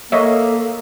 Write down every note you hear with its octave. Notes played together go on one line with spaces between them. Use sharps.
A#3 A4 C#5 D#5 E5